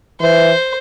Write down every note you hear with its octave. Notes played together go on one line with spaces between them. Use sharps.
E3 C5